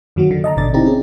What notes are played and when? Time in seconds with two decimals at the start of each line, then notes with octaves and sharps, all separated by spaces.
0.16 F#2 D#3 F#3 A#3 F#4
0.31 D3
0.44 D#5 A5 A#5
0.57 G#1 F#2 B2 D3 D5 A6
0.74 C4 D#4 E4 G4 A#5
0.86 C#4 G#4